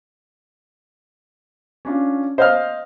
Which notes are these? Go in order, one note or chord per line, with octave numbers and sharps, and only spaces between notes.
C#4 D4 F4
C5 D#5 F5 F6